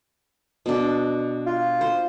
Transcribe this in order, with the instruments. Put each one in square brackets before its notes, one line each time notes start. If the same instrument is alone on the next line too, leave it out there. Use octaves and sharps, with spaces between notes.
[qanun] B2 D4
[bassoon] F4
[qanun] C5